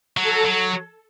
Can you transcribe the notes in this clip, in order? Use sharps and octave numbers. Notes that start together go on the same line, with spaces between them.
F#3 A4
F#3